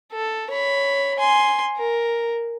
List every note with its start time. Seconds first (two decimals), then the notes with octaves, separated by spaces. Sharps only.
0.12 A4
0.51 C#5 B5
1.19 G#5 C6
1.77 A#4